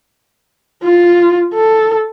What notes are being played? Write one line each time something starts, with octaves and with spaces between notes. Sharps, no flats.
F4
A4